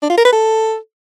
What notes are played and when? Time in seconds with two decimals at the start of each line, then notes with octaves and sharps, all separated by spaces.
0.02 D4
0.10 F4
0.18 A#4
0.25 B4
0.33 A4